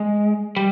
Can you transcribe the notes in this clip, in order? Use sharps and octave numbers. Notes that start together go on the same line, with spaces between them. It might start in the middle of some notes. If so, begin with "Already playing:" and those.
Already playing: G#3
G3